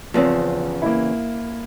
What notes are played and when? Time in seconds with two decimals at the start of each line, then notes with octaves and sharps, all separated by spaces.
0.14 E2 C#3 F3 C4 C#4
0.82 A#3 E4